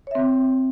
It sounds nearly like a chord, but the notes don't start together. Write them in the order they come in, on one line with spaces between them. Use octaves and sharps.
C#5 E5 C4